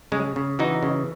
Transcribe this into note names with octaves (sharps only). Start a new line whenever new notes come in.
C#3 G#3
C#3
E3 D#4 F#4
C#3